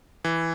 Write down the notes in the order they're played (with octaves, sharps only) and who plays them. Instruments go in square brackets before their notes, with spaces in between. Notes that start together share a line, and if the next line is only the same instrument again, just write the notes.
[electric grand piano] E3